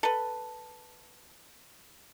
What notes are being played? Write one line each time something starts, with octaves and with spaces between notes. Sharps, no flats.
A4 B4